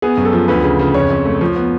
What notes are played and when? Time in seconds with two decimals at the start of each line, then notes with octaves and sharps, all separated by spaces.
0.02 B3 G#4
0.17 F#2
0.25 A4
0.33 F3
0.48 D2 B4
0.63 C#3
0.79 C#3
0.94 F2 C#5
1.10 F2
1.26 A3
1.41 F3
1.56 B3